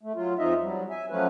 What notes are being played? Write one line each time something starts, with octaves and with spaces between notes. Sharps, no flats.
A3
F#3 F4
F2 F3 D#4 F4 D#5 E5
F#3 G3
E5 G#5
F3 F#3 A3 C#4 B4